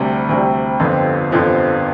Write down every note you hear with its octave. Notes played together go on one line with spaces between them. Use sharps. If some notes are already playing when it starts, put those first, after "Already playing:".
Already playing: D2 C3 G3
D2 C3 G3
G1 F2 D3 F3 C4
G1 F2 D3 F3 C4